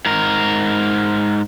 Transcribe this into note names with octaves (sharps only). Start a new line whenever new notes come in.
G#2 A#4